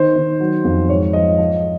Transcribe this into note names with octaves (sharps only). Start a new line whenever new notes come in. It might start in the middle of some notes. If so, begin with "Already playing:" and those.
Already playing: D#3 C5
D#3
F#3
F2
G#2 C#5
F3 D#5
F3